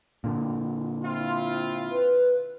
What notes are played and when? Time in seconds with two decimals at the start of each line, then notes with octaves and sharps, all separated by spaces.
0.24 A#2 D3
1.04 C4 E4 F4
1.91 B4